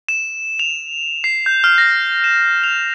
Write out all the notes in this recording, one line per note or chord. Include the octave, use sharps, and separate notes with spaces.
E7
F7
C7
G6
F6
A#6
E7
F7